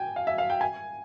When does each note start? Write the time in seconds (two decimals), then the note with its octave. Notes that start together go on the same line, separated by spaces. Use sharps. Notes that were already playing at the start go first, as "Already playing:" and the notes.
Already playing: G5 G#5
0.16 F5
0.27 E5
0.38 F5
0.50 G5
0.61 G#5